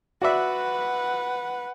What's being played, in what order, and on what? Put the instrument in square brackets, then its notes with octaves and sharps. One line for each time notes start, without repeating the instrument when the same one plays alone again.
[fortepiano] F#4 D5 E5 [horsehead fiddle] B4 F#5